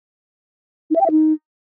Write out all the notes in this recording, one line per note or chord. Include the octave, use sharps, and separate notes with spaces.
D#4
E5
G5
E5
D#4